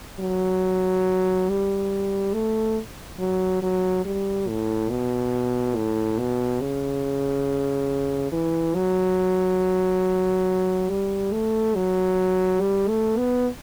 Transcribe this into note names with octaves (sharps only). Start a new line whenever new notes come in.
F#3
G3
A3
F#3
F#3
G3
A2
B2
A2
B2
C#3
E3
F#3
G3
A3
F#3
G3
A3
B3